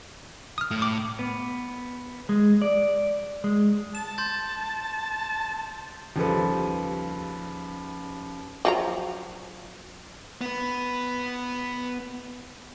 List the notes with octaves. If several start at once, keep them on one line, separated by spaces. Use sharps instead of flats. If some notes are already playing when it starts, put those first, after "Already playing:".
D#6 F6
A2
D6
B3
G#3
D5
G#3
A5 E7
C6 G6 A6
D#2 C#3 F3 G3 A4 B4
F3 F#3 A#5
B3 B4